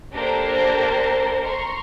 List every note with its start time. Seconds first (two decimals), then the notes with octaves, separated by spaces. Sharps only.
0.12 A#3 D4 G4 A4 A#4 C5
1.44 A#5 C6 C#6